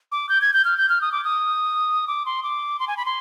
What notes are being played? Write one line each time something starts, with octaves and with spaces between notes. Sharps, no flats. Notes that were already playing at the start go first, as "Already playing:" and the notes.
D6
G6
G#6
G6
F6
G6
F6
D#6
D6
D#6
D6
C6
D6
C6
G#5
B5
C6